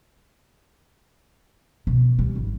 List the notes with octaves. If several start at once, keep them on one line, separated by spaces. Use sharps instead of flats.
B2
G3
G#1